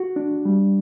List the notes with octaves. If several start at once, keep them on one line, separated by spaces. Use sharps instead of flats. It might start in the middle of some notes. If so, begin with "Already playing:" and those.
Already playing: F#4
D4
G3